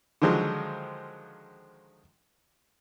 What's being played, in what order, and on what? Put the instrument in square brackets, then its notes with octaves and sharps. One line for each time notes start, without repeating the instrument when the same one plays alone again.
[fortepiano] D3 D#3 F3 F#3 G#3